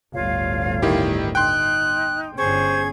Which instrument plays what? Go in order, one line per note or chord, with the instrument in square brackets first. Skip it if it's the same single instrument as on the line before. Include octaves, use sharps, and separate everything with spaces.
[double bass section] G1 D2 A2 [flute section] F4 C#5 F5
[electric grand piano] D#3 E4 G4
[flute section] D#4 [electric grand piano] G5 C6 [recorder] F#6
[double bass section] G1 C#4 [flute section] G#4 C#6 G#6 [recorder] C5